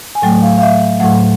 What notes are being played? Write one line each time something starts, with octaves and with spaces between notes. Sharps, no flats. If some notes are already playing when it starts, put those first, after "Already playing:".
G#5
A2 F#3 A3 G5
F5
F5
E5
A2 F#3 A3 F#5